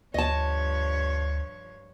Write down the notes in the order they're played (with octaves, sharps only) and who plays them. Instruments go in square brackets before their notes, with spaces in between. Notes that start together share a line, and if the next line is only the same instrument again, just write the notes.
[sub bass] D2 [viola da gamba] G2 F3 C#5 [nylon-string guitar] D#5 A5